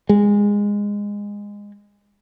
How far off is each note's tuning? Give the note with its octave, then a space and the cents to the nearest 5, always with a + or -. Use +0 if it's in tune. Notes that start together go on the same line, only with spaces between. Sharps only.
G#3 -20